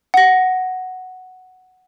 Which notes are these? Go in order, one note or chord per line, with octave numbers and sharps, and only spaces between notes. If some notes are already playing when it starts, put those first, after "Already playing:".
F#5 A#6